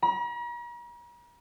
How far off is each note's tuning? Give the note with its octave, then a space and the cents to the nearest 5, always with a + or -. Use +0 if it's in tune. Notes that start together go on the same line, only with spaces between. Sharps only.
A#5 +45